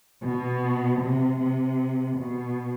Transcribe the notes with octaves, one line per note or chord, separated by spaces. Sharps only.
B2
C3
C3
B2